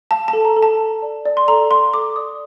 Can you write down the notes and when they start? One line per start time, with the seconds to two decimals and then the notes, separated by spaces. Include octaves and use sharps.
0.11 F5 A5
0.28 A5
0.33 A4
0.45 A#5
0.56 A4
0.63 A5
0.79 A4
1.02 D5
1.26 D5
1.37 C6
1.48 A4 A#5
1.70 F5 C6
1.94 A4 D6
2.16 D5 D#6